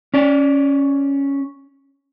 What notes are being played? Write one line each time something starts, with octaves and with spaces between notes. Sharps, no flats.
C#4 D5